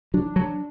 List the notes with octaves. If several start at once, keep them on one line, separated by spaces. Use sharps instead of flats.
F#3 D4
F#3